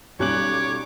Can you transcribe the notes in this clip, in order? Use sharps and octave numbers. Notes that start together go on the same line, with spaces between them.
B1 G3 C#4 C#5 D6 F#6 F#7